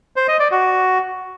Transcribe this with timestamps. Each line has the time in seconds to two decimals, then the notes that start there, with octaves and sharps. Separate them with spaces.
0.16 C5
0.28 D#5
0.40 D5
0.51 F#4